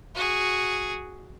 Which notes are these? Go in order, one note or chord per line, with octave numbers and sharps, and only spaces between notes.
F#4 G#4